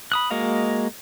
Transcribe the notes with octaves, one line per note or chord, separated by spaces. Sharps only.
B5 D#6 F#6
G#3 A#3 F#4 D#5 F5